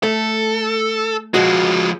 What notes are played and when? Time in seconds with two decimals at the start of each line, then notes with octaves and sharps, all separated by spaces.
0.03 A3 A4
1.34 F3 G#3 F#4 D#5